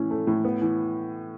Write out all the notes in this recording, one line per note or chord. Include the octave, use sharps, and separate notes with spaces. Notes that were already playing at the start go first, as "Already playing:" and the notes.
Already playing: A2 E3 C#4
A3
A2
B3
E3